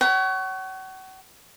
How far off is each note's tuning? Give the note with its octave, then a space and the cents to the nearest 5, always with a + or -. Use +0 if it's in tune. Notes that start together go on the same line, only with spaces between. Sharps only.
C#5 +10 F#5 +40 B5 +0